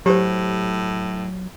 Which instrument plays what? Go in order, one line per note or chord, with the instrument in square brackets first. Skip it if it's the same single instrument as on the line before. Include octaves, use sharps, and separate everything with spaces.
[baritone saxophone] A2 [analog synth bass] F#3 [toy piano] G4 C5